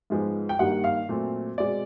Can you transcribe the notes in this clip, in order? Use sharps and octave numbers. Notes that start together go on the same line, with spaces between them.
G#2 F3 G#3 B3
G5
G2 D#3 G3 A#3 F#5
F5
A#2 F#3 A3 C4
B2 G#3 C4 D5